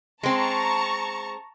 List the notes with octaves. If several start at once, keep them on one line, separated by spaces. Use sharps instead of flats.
G#3 C4 A5 A#5 C#6